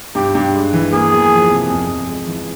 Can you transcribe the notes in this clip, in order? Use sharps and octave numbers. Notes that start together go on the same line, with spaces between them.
G2 G4
G2
G#3
E3
A#3 G#4
E2
F3
C3
F2
F2
G#3
E3